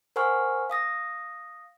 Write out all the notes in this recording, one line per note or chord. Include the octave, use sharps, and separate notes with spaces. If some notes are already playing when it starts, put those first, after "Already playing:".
A#4 C5 F#5 G#5 C#6 F6
F5 D#6 A#6